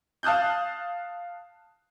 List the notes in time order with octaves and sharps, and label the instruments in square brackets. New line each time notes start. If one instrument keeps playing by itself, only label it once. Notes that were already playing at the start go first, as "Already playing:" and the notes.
[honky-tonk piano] F5 A5 D#6 F#6 G6